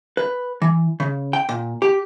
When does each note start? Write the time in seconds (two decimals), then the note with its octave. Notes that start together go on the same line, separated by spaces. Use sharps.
0.17 B4
0.62 E3
1.00 C#3
1.33 G5
1.49 A#2
1.82 G4